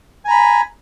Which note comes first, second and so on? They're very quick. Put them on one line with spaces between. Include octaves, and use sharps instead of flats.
G#5 A#5 B5